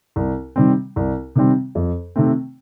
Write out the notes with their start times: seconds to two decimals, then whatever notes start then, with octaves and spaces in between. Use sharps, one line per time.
0.16 C2
0.56 C3 D#3 G3 C4
0.96 C2
1.35 C3 D#3 G3 C4
1.75 F2
2.16 C3 D#3 A3 C4